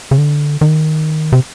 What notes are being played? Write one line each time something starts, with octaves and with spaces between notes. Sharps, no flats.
C#3
D3
D#3
C3